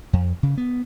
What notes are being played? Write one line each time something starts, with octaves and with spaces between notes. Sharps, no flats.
F2
C#3
B3